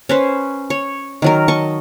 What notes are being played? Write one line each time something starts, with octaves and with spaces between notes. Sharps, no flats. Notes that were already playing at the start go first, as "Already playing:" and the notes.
C#4 B4 C5
C#5
D#3 F#3 A#4
D#5 A5 C#6